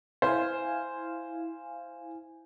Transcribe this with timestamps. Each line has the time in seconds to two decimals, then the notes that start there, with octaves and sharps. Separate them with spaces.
0.22 E4 C5 F5 G#5